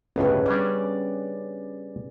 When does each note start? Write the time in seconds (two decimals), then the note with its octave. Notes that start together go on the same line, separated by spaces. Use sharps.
0.16 G1 C#2 A2 C#4 G#4 B4
0.46 G3 C#4 D4 D5